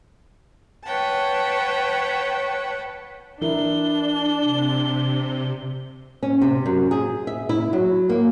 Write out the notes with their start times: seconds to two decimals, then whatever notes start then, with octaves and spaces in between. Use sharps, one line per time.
0.84 B4 C#5 F#5 G5 A5
3.42 E3 D4 E4 A#4 G7
4.41 C3
6.23 C#4
6.42 C3
6.66 F#2
6.91 G#4
7.27 E5
7.49 E4
7.73 F#3
8.09 A#3